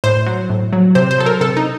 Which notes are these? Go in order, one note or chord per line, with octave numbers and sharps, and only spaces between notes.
A2 C5
F#3
A2
F#3
C3 C5
C5
F#3 A4
A#4
C3 A4
D#4